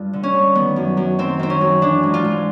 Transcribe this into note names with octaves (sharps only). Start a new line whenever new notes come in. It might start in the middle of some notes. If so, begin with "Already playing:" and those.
Already playing: G2 F4
D3
C#4
G2
D#3 B3
F#2
F#2
D#3 C4
D#3 C4
C#4
F#2
E3 D4
G#2
F4
G#2